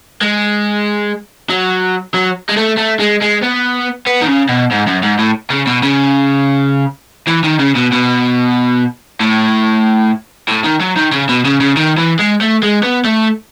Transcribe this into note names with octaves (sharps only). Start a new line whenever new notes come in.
G#3
F#3
F#3
G#3
A3
A3
G#3
G#3
B3
B3
D#3
C#3
B2
G#2
F#2
G#2
A2
C#3
B2
C#3
E3
D#3
C#3
B2
B2
A2
A2
D#3
F#3
D#3
C#3
B2
C#3
C#3
D#3
E3
G#3
A3
G#3
B3
A3